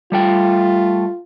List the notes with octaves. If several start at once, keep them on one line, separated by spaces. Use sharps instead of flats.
G3 A3 F4 G5